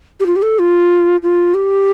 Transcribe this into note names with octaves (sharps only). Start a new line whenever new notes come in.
G4
F4
G4
A4
F4
F4
G4